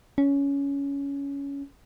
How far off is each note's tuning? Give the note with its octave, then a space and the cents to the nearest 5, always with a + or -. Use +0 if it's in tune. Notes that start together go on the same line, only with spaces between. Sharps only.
C#4 +15